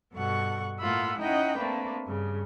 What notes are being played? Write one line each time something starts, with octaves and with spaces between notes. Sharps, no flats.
G2 B2 A4 F#5 C#6
A2 A#3 F4 F#5 B5 E6
C#4 D#4 E4 D#5 F#5 G5
A3 A#3 C4 D4 B4
G2 C#3